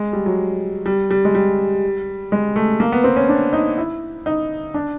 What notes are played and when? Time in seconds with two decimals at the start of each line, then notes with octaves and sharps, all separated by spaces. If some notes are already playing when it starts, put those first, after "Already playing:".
Already playing: G#3
0.13 G3
0.26 F#3
0.86 G3
1.11 G3
1.25 G#3
1.35 G3
2.32 G#3
2.56 A3
2.80 A#3
2.92 B3
3.04 C4
3.16 C#4
3.29 D4
3.53 D#4
3.78 E4
4.26 D#4
4.74 D4